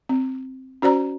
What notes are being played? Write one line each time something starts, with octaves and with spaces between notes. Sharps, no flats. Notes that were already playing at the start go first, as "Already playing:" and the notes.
C4
C#4 F#4 C5 D5 A#5